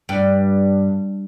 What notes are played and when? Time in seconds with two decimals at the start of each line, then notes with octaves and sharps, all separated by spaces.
0.09 G2